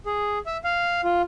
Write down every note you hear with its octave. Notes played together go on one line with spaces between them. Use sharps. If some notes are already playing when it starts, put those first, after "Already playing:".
G#4
E5
F5
F4